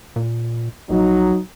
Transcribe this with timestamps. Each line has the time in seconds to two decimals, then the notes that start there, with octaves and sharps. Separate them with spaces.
0.16 A#2
0.90 A#1 F#3 D#4